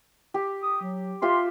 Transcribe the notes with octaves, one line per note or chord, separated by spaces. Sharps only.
G4
D#6
F#3
F4 G4 E5 C6